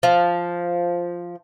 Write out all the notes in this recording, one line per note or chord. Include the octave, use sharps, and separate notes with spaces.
F3